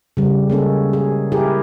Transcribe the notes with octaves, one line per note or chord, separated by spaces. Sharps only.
C#3 G3
G#3 A#3 C#4 A4
G#4
E4 G4 G#4 A#4